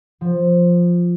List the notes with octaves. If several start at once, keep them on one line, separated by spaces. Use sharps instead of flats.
F3